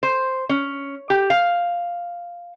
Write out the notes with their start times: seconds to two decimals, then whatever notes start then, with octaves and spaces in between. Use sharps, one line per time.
0.03 C5
0.49 C#4
1.10 G4
1.30 F5